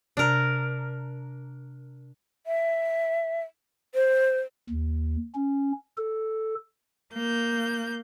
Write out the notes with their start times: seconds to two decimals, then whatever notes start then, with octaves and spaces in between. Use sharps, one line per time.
0.17 C3 D4 A#4
2.47 E5
3.95 C5
4.70 D#2
5.35 C#4
5.97 A4
7.14 A#3 G6